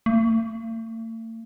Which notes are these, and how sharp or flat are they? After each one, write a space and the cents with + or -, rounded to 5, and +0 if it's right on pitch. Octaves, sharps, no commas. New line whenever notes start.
A3 +45